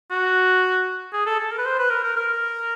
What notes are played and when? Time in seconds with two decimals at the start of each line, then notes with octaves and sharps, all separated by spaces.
0.11 F#4
1.13 G#4
1.26 A4
1.40 A4
1.52 A#4
1.58 B4
1.65 C5
1.79 B4
1.90 A#4
2.04 A#4
2.16 A#4